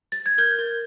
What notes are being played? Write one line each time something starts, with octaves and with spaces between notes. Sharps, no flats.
A6
G#6
A#4 G6
A#4